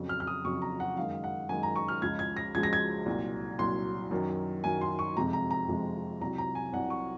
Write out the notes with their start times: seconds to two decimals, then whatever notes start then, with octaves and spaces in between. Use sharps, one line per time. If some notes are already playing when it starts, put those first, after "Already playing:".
Already playing: F2 C#3 F#3
0.09 F6
0.20 F6
0.27 D#6
0.45 F2 C#3 F#3 C#6
0.62 A#5
0.80 F#5
0.97 F#2 D#3 G#3 F5
1.24 F#5
1.49 F#2 D#3 G#3 G#5
1.63 A#5
1.76 C#6
1.88 F6
2.02 C#2 C#3 F3 G#3 G#6
2.19 G#6
2.37 A#6
2.54 C#2 C#3 F3 G#3 G#6
2.63 A#6
2.73 G#6
3.06 C2 A#2 F#3
3.59 C2 A#2 F#3 C6
4.11 F#2 D#3 F#3
4.64 F#2 D#3 F#3 G#5
4.81 C6
4.99 C#6
5.17 F2 C3 F3 G#3 A#5
5.33 A#5
5.51 A#5
5.68 F2 C3 F3 G#3
6.21 C2 C3 F#3 A#5
6.38 A#5
6.55 G#5
6.73 C2 C3 F#3 F#5
6.90 C#6